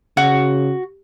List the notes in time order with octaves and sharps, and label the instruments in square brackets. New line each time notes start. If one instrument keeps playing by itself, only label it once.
[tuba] C#3 [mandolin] F#4